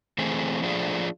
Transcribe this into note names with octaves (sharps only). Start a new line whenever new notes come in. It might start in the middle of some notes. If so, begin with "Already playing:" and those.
E3 A3 C4 G#4
F3 A3 D4 F4 G#4